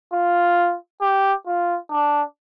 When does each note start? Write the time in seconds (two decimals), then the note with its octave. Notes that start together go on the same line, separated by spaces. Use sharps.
0.14 F4
1.02 G4
1.47 F4
1.91 D4